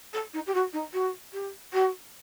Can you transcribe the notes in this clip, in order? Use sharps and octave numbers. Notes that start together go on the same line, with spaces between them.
A4
D#4
G4
F#4
D#4
F#4
G4
F#4